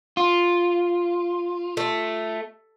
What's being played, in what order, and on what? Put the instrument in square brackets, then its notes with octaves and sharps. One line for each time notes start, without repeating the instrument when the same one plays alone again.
[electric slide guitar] F4
[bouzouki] A3